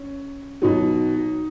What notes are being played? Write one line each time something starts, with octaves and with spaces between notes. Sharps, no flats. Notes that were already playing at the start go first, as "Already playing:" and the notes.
Already playing: C#4
B2 F#3 D#4